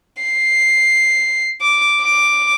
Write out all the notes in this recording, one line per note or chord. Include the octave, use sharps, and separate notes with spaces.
C7
D6
D6